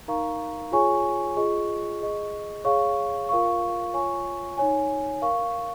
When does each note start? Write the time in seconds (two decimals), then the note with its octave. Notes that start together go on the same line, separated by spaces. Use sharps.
0.08 D#4 A#4 F5 A#5 C#6
0.72 F4 G#4 C#5 G#5 C#6
1.36 F4 G#4 D#5 C#6
2.01 G#4 D#5 C#6
2.64 G#4 C#5 F5 C#6
3.29 F4 A#4 F5 C#6
3.93 F4 C#5 G#5 C#6
4.58 D#4 C#5 G#5
5.22 A#4 F5 C#6